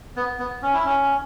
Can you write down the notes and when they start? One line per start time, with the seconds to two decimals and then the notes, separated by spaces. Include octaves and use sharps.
0.16 B3
0.39 B3
0.63 C#4
0.74 E4
0.85 C#4